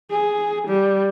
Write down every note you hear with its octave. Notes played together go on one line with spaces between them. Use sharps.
G#4
G3